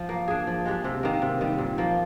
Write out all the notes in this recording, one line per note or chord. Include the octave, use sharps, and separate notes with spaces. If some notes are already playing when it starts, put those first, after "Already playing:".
Already playing: F3
A#3
D4 G#4
F3
G#3 D4 G4
C3
D#3 A#3
C3
D#3 G3
A#2
F3 A#3